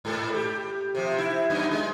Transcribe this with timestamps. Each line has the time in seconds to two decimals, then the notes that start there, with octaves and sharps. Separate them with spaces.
0.05 G#2 A4
0.34 G4
0.95 C3 F3
1.18 E4
1.50 F#2 B3 D#4
1.71 G#3